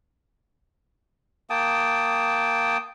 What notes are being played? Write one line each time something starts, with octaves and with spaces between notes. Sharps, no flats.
A#3 G5 A5 D#6